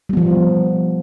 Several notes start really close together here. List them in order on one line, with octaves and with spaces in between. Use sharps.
G3 B3 F3